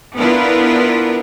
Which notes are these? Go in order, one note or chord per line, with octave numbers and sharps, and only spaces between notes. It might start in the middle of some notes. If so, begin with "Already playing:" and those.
B3 D4 E4 F4 A#4 B4